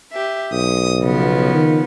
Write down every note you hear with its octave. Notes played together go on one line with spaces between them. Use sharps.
G4 E5
B1 D#6
C#3 F3 B3
D#3